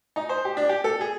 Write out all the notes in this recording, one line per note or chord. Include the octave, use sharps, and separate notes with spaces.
D#4
C5
G4
D4
G4
A4
G#4